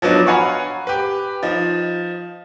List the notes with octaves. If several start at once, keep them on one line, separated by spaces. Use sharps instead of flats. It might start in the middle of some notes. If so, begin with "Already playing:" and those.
F3 F#3 B3 D4 D#4
C#5 F5 F#5 G#5 A#5 B5
G4 B4
F3 D#4